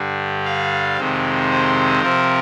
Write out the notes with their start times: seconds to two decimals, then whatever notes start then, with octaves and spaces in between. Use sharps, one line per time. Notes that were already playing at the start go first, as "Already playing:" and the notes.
Already playing: G2 D3 G3
0.45 F5
0.96 F2 C3 D#3 G#3 C4
1.50 C5
2.02 C3 F3 C4 A#4